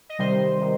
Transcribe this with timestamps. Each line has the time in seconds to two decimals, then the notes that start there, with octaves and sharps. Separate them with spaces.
0.09 D#5
0.19 C3 D#3 G3 C5
0.61 C3 D#3